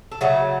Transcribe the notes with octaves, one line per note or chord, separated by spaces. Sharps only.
A4
C#3 F#3 A3 G#4